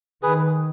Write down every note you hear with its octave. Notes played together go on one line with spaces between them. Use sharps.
D#3 G#4 B4